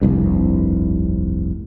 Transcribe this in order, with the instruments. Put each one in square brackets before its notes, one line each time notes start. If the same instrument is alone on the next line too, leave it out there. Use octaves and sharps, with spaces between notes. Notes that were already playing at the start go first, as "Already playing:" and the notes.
[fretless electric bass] F1 C2 G2